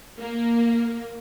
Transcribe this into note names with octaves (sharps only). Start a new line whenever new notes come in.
A#3